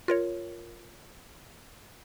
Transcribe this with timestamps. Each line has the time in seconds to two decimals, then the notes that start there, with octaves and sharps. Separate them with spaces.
0.08 F4 A#4 C#5